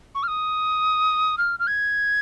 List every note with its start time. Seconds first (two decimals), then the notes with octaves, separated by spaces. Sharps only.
0.15 C#6
0.23 F6
0.27 D#6
1.38 F6
1.59 F6
1.67 G#6